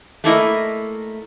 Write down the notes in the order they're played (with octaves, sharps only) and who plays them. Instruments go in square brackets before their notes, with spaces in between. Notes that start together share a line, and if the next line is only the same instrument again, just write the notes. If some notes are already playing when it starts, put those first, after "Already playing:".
[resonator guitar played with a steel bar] A3 A#3 E4 D#5